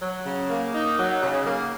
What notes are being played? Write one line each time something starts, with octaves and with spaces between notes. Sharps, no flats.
F#3
C#3
A#3
D#4
F#3
C#3
A#3